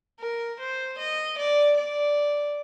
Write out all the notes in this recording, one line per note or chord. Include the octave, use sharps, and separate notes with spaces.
A#4
C5
D#5
D5
D5